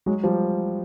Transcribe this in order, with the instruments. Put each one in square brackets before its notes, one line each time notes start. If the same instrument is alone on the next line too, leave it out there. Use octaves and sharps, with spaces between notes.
[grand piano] F#3 G#3
F3 G3